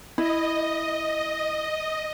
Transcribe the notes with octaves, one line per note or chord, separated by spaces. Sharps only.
E4 D#5